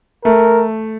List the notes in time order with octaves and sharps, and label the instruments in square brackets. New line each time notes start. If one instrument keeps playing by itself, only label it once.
[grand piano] A3 [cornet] A#4